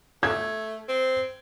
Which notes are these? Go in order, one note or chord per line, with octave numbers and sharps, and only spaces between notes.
A3 G#6
C4